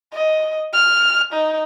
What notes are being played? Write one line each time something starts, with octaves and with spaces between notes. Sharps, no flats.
D#5
F6
D#4